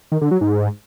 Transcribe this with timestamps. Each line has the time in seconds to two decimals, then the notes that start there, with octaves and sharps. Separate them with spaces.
0.12 D#3
0.21 D3
0.31 F#3
0.41 G#2